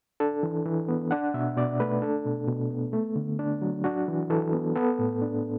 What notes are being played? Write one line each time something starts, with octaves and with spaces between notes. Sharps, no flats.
D4 A4
E3
E3
B3
D4 F#5
B2 E5
B2 D5
A3 B4
D4 A4
B2
B2
B3
A3
D3
D4
F#3
D4 F#4
E3
E3 A4
B3
B3 A4
A2
D4